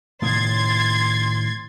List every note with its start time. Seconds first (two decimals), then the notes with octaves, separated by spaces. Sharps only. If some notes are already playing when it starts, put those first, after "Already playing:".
0.22 A2 C3 D#3 C6 G#6 A6